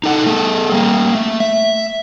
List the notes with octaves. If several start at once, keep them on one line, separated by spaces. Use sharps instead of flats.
D#4 A4 F#5
A3 G#4 A4
G3 A#3
A3
E5